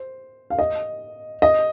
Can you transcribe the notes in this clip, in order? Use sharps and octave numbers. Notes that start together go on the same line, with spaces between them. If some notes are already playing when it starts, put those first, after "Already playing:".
Already playing: C5
F5
D#5
D#5